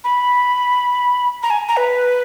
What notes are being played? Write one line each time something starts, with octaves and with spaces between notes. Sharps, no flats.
B5
A#5
G#5
A#5
B4